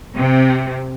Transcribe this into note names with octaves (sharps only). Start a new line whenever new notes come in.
C3